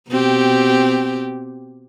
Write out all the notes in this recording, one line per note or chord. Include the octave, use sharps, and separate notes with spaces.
B2 C4 G4